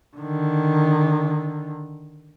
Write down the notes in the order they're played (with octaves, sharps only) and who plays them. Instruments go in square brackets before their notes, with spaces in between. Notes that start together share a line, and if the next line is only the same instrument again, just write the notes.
[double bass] D3 D#3